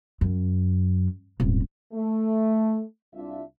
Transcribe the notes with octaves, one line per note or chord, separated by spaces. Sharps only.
F#2
D#1 G#1
A3
C2 D4 F4 E5